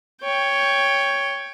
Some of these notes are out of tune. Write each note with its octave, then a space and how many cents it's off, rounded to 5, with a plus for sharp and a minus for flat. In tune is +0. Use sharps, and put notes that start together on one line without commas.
C#5 +5 G5 +10